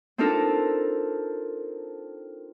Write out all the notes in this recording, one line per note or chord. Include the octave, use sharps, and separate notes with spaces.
C4 D4 D#4 F4 A4 A#4